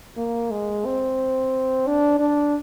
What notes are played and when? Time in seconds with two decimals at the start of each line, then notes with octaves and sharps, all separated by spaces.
0.17 A#3
0.51 G#3
0.86 C4
1.87 D4
2.20 D4